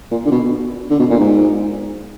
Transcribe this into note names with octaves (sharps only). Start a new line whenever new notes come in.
A#2
D3
B2
D3
B2
A#2
G#2